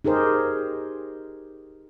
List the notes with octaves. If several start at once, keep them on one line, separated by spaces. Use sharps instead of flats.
D#4 G4 G#4 A#4 C5